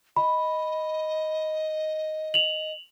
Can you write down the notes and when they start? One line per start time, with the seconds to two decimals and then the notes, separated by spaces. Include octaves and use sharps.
0.17 D#5 B5
2.34 F7 F#7